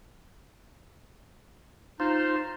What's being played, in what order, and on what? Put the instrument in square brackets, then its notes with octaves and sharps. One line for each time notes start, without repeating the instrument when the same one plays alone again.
[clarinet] D#4 [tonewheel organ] F4 C5